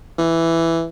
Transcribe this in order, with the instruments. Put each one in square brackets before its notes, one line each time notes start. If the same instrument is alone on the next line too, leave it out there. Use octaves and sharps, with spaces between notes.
[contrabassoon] E3